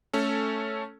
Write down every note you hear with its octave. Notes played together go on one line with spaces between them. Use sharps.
A3 C#4 A4